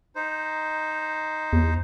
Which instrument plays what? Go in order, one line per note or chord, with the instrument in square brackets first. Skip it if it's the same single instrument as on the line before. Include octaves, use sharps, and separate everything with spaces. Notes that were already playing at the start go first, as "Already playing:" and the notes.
[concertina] D#4 C5
[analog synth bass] E2